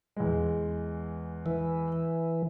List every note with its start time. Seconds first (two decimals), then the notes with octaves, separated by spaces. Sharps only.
0.16 E2 G#3
1.46 E3